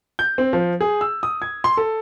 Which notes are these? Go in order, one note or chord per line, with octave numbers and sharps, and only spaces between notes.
G6
C4
F3
G#4
E6
D#6
G#6
C6
A4